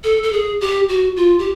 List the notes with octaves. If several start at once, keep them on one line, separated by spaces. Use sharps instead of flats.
A4
A4
G#4
G4
F#4
F4
G4